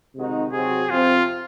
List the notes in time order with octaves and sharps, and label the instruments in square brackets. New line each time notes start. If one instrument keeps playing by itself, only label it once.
[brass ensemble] C3 D#3 G#3 D#4 F#4
[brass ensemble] C3 F#3 C4 F#4 [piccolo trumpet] G#4
[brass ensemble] F2 C3 F3 C4 [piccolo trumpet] F4